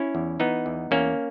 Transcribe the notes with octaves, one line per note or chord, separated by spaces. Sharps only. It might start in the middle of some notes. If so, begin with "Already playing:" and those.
Already playing: C#4 E4
E2
E3 B3 D#4
E2
E2 A#3 C#4